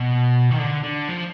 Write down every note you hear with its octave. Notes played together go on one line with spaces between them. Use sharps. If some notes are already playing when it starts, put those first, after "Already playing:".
Already playing: B2
D#3
D3
D3
F3